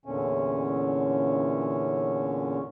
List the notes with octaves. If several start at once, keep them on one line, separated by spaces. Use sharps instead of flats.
E2 A#2 D3 C#4